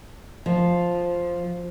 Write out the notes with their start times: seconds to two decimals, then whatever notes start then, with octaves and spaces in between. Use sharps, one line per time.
0.46 F3